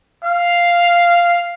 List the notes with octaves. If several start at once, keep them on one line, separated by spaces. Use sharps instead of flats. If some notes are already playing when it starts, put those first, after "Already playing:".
F5